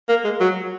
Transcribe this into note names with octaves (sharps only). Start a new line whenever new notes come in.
A#3
G#3
F#3